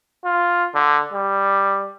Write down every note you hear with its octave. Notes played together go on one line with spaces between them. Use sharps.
F4
D3
G3